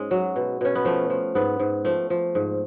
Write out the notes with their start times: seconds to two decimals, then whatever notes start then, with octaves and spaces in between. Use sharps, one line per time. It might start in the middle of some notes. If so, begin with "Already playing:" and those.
Already playing: G#2 G#3 C#4
0.11 F#3
0.36 B2
0.61 B2 C#4
0.75 B3
0.85 F3 A3
1.10 F3
1.35 G#2 B3
1.59 G#2
1.85 F3 A3
2.10 F3
2.35 G#2